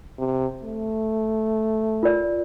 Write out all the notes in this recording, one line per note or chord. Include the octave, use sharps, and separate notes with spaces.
C3
A3
F4 A#4 D5